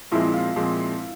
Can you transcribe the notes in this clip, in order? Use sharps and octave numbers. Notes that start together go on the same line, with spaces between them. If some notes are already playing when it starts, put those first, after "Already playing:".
A#2 F3 G#3 C4 E4
F4
A#2 F3 G#3 C4